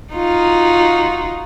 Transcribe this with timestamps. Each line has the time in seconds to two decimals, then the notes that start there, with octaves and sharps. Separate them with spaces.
0.14 D#4 F4 F#4